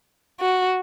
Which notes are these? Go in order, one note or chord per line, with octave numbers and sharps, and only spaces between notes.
F#4